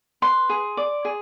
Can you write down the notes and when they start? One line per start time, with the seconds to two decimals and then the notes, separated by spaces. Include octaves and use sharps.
0.22 B4 C6
0.50 G#4
0.77 D5
1.05 G#4